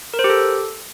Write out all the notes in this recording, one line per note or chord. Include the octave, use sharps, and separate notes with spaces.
A#4
C5
G4
A4